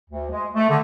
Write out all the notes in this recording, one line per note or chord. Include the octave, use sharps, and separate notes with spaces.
D2
G#3
A3
D3